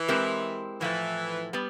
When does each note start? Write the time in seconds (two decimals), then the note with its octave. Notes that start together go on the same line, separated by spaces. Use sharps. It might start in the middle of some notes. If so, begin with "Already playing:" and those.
Already playing: E3
0.08 G#3 C4 E4 G4 A#4
0.81 A2 E3 F3 A3
1.53 G3 B3